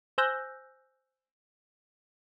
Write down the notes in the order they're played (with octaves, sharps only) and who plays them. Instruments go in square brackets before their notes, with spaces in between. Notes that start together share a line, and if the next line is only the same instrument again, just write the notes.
[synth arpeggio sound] C5 G#5 E6 F#6 G6 A#6